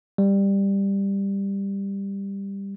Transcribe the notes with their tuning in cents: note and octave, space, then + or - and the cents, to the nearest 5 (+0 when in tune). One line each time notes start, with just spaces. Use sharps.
G3 +10